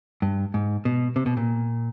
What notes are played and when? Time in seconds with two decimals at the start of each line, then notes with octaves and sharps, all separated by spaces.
0.22 G2
0.54 G#2
0.85 B2
1.16 C3
1.26 B2
1.37 A#2